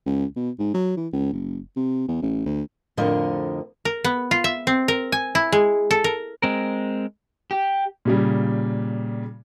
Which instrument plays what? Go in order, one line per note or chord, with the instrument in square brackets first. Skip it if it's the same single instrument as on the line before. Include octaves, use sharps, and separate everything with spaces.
[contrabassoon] C#2
B2
G#2
F#3
E3
C#2
F#1
C3
E2
A1
D2
[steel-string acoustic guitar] F2 A2 D3 F3 A#4 D#5
[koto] A#4
B3
F4
E5
C4
A#4
G#5
E4
G#3
A4
A#4
[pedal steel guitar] G#3 C4 A#4
[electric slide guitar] G4
[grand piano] A#2 C#3 G3